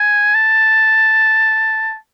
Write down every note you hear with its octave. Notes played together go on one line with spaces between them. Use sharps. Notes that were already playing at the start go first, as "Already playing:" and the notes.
Already playing: G#5
A5